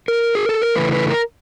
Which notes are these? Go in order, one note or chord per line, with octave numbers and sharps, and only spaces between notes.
A#4
G#4
A4
A#4
C#3 E3 A3 B4
B4
A#4